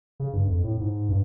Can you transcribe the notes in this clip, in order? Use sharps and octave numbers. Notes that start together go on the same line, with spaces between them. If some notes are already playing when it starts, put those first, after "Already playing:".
C#3
G2
F2
A2
G#2
G2